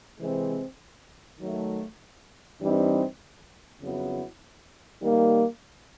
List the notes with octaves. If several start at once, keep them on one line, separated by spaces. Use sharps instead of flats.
C3 E3 G#3 C4
D#3 F#3 A3
G2 E3 G3 C4 D#4
F2 C#3 F#3 B3 E4
D#3 G3 A#3